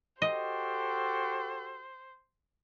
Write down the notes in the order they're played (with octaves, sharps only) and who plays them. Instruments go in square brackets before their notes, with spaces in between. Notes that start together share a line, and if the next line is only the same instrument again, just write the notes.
[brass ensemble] F#4 G4 A4 [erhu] C5 [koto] D#5